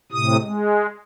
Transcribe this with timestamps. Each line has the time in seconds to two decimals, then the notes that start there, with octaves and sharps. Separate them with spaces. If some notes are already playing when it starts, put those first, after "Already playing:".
0.12 A2 C3 D#6
0.42 G#3